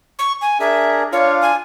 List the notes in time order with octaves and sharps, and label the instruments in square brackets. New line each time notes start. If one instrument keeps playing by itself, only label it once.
[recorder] C#6
G#5
[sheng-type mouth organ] D4 G#4 A#4 [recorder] E5
[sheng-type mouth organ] D4 F4 F5 [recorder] C#5
[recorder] G#5